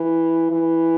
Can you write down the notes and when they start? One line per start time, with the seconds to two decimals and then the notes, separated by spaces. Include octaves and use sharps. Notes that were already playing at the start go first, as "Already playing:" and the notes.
Already playing: E3
0.51 E3